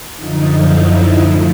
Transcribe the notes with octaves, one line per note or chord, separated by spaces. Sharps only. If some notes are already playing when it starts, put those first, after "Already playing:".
F#2 D3 F3 D#4
E4
A2 F3